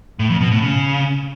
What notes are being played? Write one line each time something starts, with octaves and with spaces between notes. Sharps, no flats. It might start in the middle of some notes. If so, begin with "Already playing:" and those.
A2
F2
B2
A2
C#3